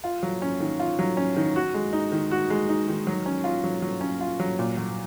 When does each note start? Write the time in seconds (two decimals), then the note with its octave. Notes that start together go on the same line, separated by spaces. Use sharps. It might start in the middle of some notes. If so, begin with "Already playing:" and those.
0.04 F4
0.23 F#3
0.42 C#4
0.60 D#3
0.80 F4
0.99 F#3
1.17 C#4
1.36 D#3
1.56 F#4
1.74 G#3
1.93 D#4
2.12 D#3
2.31 F#4
2.50 G#3
2.69 D#4
2.88 D#3
3.07 F#3
3.26 C#4
3.44 F4
3.64 F#3
3.82 F#3
4.01 C#4
4.21 F4
4.40 F#3
4.59 A#2
4.77 F#3